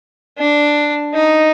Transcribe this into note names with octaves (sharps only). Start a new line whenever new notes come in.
D4
D#4